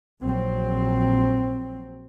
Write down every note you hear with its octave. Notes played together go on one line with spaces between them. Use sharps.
A#1 F#3 C4